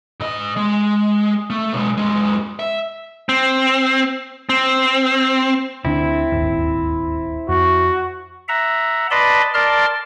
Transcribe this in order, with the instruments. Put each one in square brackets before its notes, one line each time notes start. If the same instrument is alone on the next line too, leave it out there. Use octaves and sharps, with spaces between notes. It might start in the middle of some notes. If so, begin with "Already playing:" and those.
[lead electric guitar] G#2 D#5
G#3
A3
B1 G#3
F#2 G#3
E5
C4
C4
[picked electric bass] D2 D3 D4 [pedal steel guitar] C4 E4
[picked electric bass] D1 G1 D#2
[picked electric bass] F2 [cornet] F#4
[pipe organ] E5 F#5 A#5
B4 D5 D#5 A5 B5 C6
A#4 D5 A5 C6 F6